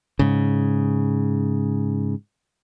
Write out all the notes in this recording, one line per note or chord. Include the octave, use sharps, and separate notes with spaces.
G#2 C#3